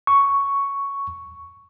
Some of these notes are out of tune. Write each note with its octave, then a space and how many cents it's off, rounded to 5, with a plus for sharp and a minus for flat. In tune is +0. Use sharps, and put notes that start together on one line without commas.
C#6 +5